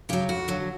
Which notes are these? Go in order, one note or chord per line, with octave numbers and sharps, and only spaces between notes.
C#3 F#3 G4
F2 F#4
D3 F#3